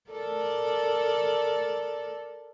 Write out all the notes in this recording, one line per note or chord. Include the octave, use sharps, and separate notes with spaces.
A4 A#4 D5